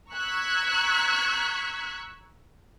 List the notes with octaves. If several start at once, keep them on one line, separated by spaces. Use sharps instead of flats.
A#5 C#6 E6 F#6 G#6 B6